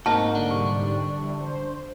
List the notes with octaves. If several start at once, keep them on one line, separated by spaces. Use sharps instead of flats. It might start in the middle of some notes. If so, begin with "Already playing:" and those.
G#2 A#3 C4 D#4 F#4 A5 F6
D3 D4
G#2 C3 G3 C#6
E3 G3
C5